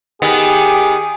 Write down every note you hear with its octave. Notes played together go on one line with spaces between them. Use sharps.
D#3 B3 G4 G#4